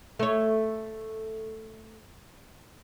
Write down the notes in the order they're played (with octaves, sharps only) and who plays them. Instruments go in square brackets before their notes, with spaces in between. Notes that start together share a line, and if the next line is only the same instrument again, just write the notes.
[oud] A3 C#5